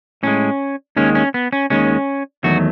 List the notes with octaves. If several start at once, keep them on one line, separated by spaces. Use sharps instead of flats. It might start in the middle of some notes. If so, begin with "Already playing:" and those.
A2 G#3 C#4
D#2 D#3 G#3 C#4
C#4
B3
C#4
D#2 D#3 G#3 C#4
E2 D#3 F#3 A3 F#4